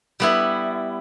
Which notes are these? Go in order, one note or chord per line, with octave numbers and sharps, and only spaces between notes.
G3 B3 E4